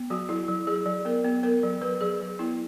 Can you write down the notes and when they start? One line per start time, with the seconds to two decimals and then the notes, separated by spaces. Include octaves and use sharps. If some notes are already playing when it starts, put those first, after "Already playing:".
Already playing: B3
0.10 F#3 F#4
0.29 F#3 E4
0.48 F#3
0.67 F#3 G#4
0.86 F#3
1.05 B3 A#4
1.25 B3
1.43 B3 A#4
1.63 F#3
1.82 F#3 B4
2.01 F#3 G#4
2.20 F#3
2.39 B3 E4